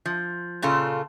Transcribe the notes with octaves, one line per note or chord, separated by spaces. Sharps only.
F3
A#2 C#3 F4 A4